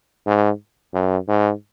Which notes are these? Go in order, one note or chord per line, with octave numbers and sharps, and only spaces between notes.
G#2
F#2
G#2